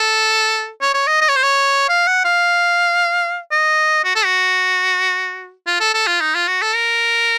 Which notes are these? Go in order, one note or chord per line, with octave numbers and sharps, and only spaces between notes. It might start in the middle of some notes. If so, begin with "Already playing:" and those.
Already playing: A4
C#5
C#5
D#5
D#5
C#5
C5
C#5
F5
F#5
F5
D#5
F#4
A4
F#4
F4
A4
A4
F4
D#4
F4
F#4
A4
A#4